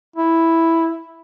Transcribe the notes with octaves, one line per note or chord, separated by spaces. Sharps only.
E4